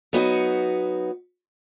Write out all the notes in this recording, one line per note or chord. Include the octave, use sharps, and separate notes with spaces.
F#3 B3 D#4 F#4